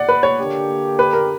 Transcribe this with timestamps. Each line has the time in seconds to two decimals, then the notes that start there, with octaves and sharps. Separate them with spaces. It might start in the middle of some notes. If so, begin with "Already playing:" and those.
Already playing: D5 F#5
0.09 B4
0.23 C#5
0.39 D3 A#3 D4 G4
0.99 B4
1.13 A#4